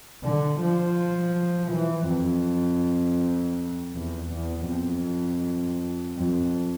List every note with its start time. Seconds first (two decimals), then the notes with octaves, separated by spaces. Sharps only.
0.24 D3
0.61 F3
1.72 E3
2.10 F2
3.95 E2
4.32 E2
4.69 F2
6.18 F2